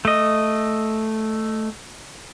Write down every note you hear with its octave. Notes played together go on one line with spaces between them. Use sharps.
A3 D#5